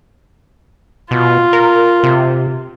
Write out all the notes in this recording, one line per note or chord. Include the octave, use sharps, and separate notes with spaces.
B2 F4
A#4
C3